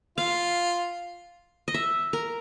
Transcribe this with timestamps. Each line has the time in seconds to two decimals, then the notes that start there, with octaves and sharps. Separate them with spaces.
0.18 F4 F5
1.68 D#5
1.74 E5
2.13 A#4